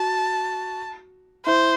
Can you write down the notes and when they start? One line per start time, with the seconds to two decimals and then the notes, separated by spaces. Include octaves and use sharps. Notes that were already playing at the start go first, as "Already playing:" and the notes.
Already playing: F#4 A5
1.46 E4 C5